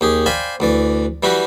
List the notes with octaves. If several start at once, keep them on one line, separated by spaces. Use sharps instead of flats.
D#2 G4 G#4
C5 D5 F5 G5 G#5 B5
D2 E3 D5
E3 G3 E4 F#4 G4